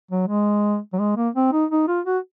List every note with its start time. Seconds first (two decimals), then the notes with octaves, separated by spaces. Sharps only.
0.11 F#3
0.28 G#3
0.93 F#3
0.99 G#3
1.17 A#3
1.35 C4
1.53 D#4
1.71 D#4
1.88 F4
2.06 F#4